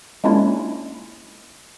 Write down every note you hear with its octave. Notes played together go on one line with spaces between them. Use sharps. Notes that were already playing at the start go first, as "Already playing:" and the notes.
G#3 A#3 C#4 D4 E4 F4